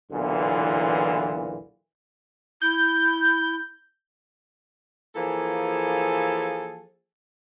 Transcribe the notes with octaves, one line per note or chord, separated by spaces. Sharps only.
B1 E2 A#2 D3 E3
E4 G6
E3 F3 A#3 G#4 A4